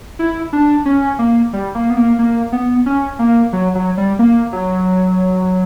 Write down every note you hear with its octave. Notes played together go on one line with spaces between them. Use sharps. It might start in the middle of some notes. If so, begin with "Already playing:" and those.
E4
D4
C#4
A#3
G3
A#3
B3
A#3
A#3
B3
C#4
A#3
F#3
F#3
G3
A#3
F#3